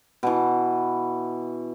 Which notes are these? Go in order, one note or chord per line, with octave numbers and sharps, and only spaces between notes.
B2 E3